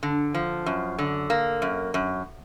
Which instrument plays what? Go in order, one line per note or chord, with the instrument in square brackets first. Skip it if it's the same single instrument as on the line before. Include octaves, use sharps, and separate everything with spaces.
[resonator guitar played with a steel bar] D3
F3
F#2
D3
A#3
F#2
F#2